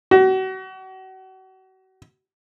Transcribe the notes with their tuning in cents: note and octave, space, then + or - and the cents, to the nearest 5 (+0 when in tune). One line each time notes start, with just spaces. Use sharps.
F#4 +35